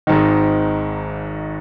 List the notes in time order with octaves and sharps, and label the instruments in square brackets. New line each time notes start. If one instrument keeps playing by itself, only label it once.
[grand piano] G#1 G#2 D#3